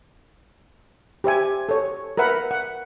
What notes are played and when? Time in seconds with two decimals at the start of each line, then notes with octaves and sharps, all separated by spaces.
1.24 G4 C5 E5 G#5
1.69 A4 C#5
2.18 A#4 B4 E5 F#5 B5
2.51 F#5